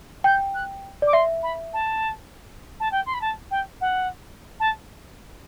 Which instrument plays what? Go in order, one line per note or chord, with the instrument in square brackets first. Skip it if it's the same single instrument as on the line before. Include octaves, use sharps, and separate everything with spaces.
[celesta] G5 [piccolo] G6
[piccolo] F#6
[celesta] D5 [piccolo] D6
[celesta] E5 [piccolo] C6
[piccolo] B5
A5
A5
G5
C6
B5
A5
G5
F#5
A5